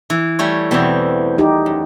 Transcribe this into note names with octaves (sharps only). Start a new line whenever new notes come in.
E3
G3 A3 C#5
E2 B2 E3 G3 C4
D#4 G4
F#2